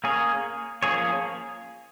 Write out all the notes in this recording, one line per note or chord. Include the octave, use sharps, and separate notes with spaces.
A#3 C#4 G#4 C#5
F3 A#3 C#4 G#4 C#5